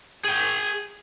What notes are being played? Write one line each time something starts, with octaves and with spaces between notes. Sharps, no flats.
G#4 G5